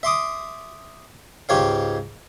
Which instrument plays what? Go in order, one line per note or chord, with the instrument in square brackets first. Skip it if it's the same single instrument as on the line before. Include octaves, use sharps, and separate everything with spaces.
[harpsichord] E5 C6 D6 D#6
C#2 G#2 G4 C#5 F5